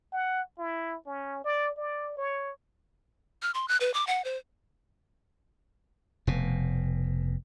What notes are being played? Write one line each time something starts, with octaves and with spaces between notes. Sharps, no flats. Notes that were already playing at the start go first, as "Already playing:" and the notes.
F#5
E4
C#4
D5
D5
C#5
F6
C6
F#6
B4
D6
F#5
C5
F1 B2